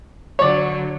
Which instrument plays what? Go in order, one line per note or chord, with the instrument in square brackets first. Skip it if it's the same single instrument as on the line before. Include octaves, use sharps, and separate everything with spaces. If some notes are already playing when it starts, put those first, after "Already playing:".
[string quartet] D3 F#3 [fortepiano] C#5 D5